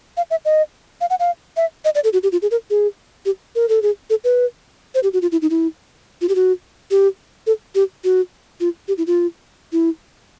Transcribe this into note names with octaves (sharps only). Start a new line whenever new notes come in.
F5
E5
D#5
F5
F#5
F5
E5
D#5
D5
A4
F#4
G4
F4
G#4
A#4
G#4
G4
A#4
A4
G#4
A4
B4
C5
G4
F#4
F4
E4
D#4
E4
F4
G4
F#4
G4
A4
G4
F#4
F4
G4
E4
F4
E4